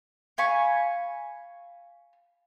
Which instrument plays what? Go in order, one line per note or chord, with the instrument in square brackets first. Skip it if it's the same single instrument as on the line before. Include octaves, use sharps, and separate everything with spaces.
[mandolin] F5 G#5 B5 C#6